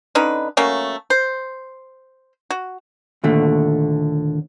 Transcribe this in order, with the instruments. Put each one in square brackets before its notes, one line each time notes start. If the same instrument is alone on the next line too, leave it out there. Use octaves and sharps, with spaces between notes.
[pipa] D3 C#4 D#4 B4
F#3 A3 A#3 C#4
C5
F#4
[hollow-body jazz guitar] D#2 A#2 D3 A3